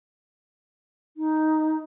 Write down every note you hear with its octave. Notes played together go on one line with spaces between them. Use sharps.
D#4